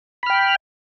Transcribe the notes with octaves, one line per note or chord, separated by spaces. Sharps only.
G5 B5 F6